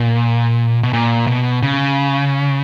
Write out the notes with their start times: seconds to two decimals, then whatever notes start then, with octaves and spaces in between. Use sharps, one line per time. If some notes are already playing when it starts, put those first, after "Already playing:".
Already playing: A#2
0.83 B2
0.93 A#2
1.27 B2
1.63 C#3